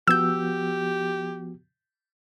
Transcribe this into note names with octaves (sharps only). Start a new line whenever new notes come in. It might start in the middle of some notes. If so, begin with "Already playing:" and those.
F3 B3 F#4 G4 E6 G6